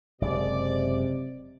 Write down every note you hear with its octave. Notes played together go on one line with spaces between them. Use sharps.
F#1 C3 G#3 D5